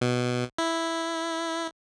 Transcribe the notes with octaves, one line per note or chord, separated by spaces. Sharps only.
B2
E4